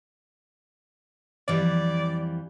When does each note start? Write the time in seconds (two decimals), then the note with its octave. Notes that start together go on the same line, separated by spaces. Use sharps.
1.48 F2 E3 G3 D5